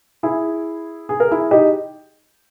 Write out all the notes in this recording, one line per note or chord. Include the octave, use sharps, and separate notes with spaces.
E4 G#4
G#4
A#4
E4 G#4
D#4 G4